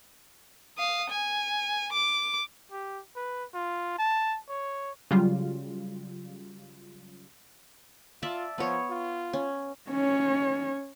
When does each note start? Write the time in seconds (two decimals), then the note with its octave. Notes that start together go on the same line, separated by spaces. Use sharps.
0.78 F5 D#6
1.09 G#5
1.92 D6
2.72 G4
3.16 B4
3.54 F4
3.98 A5
4.49 C#5
5.11 C#3 F#3 G3 F4
8.22 F4 D5 E5 A5
8.58 F3 B3 C#5
8.90 F4
9.33 C#4
9.90 C#4 C#5